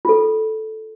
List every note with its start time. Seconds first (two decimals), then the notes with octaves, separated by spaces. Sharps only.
0.05 F4 A4